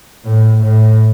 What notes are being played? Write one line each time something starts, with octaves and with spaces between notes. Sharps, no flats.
A2
A2